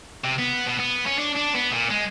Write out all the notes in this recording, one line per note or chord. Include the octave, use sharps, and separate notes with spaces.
C3
B3
B2
B3
C#4
D4
D4
B3
A#2
G#3